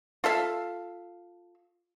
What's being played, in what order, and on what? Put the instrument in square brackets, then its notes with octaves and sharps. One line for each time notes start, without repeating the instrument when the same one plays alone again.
[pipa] F4 A4 E5 F5